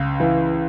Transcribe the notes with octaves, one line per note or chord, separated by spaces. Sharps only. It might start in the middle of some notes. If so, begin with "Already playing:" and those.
Already playing: C#2 C#3
E3